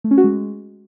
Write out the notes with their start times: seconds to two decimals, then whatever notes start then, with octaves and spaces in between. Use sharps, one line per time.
0.04 A3
0.11 C#4
0.17 F#4
0.24 G#3